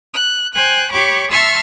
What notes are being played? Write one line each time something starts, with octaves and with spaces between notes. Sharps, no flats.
F#6
C5 G5 G#5 F#6
G4 C#5 B5 C#6 D6
E5 A5 C6 C#6 E6 F6